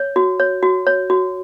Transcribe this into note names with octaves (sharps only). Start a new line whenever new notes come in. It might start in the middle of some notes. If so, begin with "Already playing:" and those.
Already playing: C#5
F#4
C#5
F#4
C#5
F#4